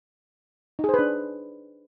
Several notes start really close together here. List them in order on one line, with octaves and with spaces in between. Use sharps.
D#4 G#4 C5 B4 D4